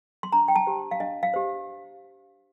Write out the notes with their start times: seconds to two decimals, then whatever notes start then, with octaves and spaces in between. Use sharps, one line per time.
0.23 C6
0.33 D4 A#5
0.48 G5
0.56 A5
0.67 G4 C5
0.91 F5
1.00 D4 D#5
1.23 F5
1.34 G4 C5